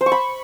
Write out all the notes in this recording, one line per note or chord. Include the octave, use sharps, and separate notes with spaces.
C5
C#6
B5